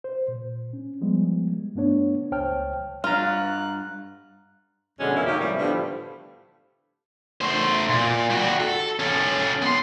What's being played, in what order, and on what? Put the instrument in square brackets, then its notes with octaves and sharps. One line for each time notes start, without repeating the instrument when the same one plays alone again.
[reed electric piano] C5
A#2
C#4
F3 G3 G#3 B3
G2 A3 B3 D4 C#5
C#2 C5 C#5 G5 A5 F6
[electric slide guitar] G2 A#5 [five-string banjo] F4 [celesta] F6 [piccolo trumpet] F#6
[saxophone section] F2 B2 D3 G#3 C#4
F#2 B2 E3 A#3 E4
D#3 A#3 C#4 G4
F#2 A2 C3 E3 G3
A2 D3 F3 G3 B3
[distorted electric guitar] A3 C5
A#2
G3 F#4
A4
C#4 A4
B3 C6